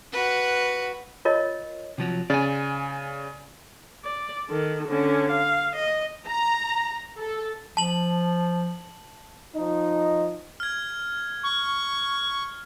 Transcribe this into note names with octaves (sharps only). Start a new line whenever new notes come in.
F#4 B4
F4 A#4 C#5 D#5
C3 F3 F#3
C#3 D5 G#5
D5
D#3 A4
D3 C#4
F5
D#5
A#5
A4
F3 A5 F#7
F3 D#4
F6 G#6
C#6